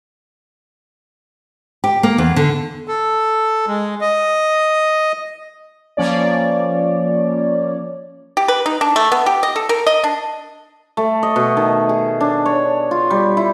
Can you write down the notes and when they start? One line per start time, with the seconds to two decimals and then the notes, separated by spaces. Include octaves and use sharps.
1.84 G4
2.03 A#3
2.18 E2
2.36 D3
2.88 A4
3.68 G#3
4.01 D#5
5.97 F3 A#3 C#4 C#5 D5
8.37 G4
8.48 B4
8.66 D#4
8.81 D4
8.96 A3
9.12 B3
9.26 G4
9.43 D#5
9.56 A4
9.69 A#4
9.87 D#5
10.04 D4
10.97 A3
11.23 D#5
11.36 B2
11.57 D#3
11.89 G#4
12.21 D4
12.46 C#5
12.91 F4
13.10 G3
13.37 E4